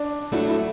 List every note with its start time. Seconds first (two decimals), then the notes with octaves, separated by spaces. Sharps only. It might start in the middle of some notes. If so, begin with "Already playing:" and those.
Already playing: D4
0.32 F#3 A3 D4 E4 F#4
0.49 E4